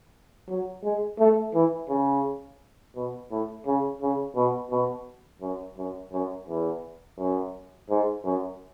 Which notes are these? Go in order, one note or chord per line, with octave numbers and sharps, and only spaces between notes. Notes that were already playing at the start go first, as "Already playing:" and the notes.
F#3
G#3
A3
E3
C#3
B2
A2
C#3
C#3
B2
B2
F#2
F#2
F#2
E2
F#2
G#2
F#2